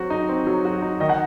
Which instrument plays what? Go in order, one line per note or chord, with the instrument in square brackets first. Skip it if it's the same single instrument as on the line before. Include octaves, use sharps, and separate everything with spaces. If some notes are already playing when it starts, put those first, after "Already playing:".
Already playing: [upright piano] F#3 C4 F#4
D#4
C4
F#3
F#4
D#4
[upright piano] D#3 [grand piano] D#5
[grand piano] F#5